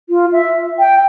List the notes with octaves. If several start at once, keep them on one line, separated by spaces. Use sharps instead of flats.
F4
E5
G5